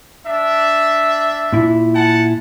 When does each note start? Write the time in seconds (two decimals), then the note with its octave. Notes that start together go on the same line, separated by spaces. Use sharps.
0.26 D4 E5
1.53 A#2 E4
1.94 F#5 G#5 A5